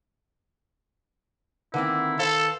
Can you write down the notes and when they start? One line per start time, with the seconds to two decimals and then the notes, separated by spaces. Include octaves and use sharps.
1.74 D3 D#3 A#3 C4 E4 B4
2.19 A4 C5 F5